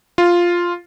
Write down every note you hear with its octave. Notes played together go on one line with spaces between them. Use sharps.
F4